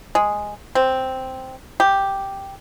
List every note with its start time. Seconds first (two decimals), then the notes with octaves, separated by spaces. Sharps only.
0.15 G#3
0.75 C4
1.80 G4